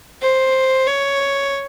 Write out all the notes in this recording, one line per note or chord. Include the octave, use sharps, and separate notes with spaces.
C5
C#5